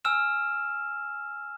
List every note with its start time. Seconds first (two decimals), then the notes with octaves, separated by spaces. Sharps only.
0.05 G#5 E6 F6 E7